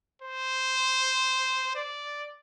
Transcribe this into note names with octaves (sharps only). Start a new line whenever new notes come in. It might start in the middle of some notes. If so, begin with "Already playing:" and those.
C5
D5